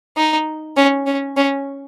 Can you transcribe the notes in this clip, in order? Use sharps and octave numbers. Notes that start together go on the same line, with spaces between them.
D#4
C#4
C#4
C#4